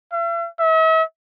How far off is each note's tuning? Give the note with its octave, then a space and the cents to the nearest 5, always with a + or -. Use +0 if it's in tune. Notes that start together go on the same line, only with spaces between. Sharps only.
E5 +45
E5 -45